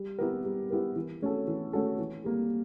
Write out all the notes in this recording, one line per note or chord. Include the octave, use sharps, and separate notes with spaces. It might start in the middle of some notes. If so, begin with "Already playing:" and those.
Already playing: G3
B3 E4 G4 A#4
G3
B3 E4 G4 A#4
E3
A3 C#4 F#4 A4
E3
A3 C#4 F#4 A4
E3
G3 A#3